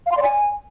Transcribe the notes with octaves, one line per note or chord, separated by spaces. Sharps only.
F5
C6
D5
G#5